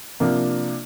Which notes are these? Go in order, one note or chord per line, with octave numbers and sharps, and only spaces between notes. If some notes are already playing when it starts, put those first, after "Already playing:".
C3 F3 A#3 D4